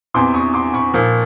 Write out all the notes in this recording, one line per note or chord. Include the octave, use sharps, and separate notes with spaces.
E2 C3 E3 C6 D6
C#6 D#6
C6 D6
B5 C#6
A#2 F3